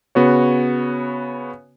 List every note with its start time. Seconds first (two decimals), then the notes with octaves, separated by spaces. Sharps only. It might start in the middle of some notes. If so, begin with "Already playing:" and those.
0.15 C#3 B3 F#4 C#5